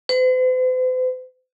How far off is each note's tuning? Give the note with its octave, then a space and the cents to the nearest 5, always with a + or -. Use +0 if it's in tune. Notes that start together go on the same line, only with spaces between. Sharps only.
C5 -45